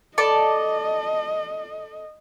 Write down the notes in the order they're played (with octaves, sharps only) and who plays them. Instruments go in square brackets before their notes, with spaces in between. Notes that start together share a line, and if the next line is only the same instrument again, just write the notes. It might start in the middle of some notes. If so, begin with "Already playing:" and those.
[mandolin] A4 D5 A5 [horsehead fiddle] D#5